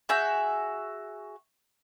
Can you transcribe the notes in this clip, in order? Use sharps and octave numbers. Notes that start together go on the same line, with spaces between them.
F#4 G#4 E5 G6